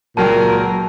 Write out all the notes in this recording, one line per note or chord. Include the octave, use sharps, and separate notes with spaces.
C#2 A#2 F#3 A#4 G5 A5